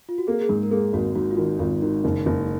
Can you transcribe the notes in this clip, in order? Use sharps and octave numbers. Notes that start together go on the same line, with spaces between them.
F4
F#4
A#3 G#4
G#4
G#2 A#4
A#4
A#3 G#4
G#1 F#4
G#2 F#4
F4
D#3 F#4
G#1 F4
D#3 F#4
F#1
F#1